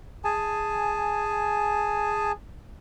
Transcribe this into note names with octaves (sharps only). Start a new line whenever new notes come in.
G#4 G#5 A5